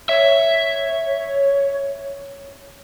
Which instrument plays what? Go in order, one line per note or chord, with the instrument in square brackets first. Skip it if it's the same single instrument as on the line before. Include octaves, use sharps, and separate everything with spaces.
[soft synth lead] C#5 [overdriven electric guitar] E5